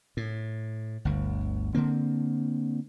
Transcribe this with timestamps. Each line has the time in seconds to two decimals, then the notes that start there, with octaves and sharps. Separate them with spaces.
0.17 A2
1.05 G1 D2
1.75 D3 A#3 C4